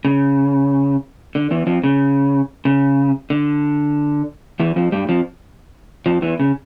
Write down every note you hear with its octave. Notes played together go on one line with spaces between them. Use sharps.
C#3
D3
E2 E3
F2 F3
C#3
C#3
D3
E2 E3
F2 F3
G2 G3
F2 F3
F2 F3
E2 E3
C#3